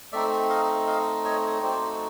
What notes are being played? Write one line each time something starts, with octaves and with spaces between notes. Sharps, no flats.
A3 C4 D#4 D5 E5
D#5 F5
D#5 F5
C#5 D#5
A3 C4 D#4 F#4 C5 D5